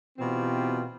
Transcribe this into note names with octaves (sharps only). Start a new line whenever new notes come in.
B2 E3 C4 F4 G4